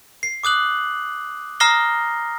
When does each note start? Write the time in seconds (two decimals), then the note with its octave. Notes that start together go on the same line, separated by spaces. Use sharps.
0.23 C7
0.44 D6 D#6 F#6 F#7
1.60 A#5 D#6 F6 A#6 C7 G7